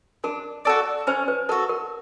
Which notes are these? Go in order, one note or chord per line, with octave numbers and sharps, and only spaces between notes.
D4 A#4
F#4 A4 D5
C#4 C5
B4
F#4 A4 A#4
A#4